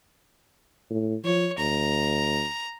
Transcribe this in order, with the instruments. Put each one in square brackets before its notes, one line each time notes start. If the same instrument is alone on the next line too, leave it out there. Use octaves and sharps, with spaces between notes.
[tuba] A2
[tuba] F3 [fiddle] C#5
[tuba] D2 [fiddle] A#5